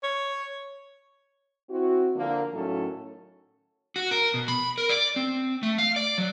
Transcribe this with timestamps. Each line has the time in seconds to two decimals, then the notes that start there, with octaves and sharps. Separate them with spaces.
0.03 C#5
1.70 C4 E4 F#4
2.16 D3 F3 A#3
2.54 A2 D#3 F#3 C#4 A4
3.96 F#4
4.11 A#4
4.34 B2
4.48 B5
4.78 A#4
4.90 D5
5.16 C4
5.63 A3
5.78 F5
5.96 D5
6.18 F#3